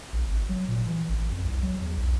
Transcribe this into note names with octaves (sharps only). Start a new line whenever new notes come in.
A#1
G#1
F#3
A#2
E3
A1
F2
C2
F#3
E2
B1